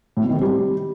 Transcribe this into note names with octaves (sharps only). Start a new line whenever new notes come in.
A2
B2
D#3
C3
G3